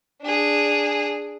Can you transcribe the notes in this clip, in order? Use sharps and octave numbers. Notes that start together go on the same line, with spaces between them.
D4 G#4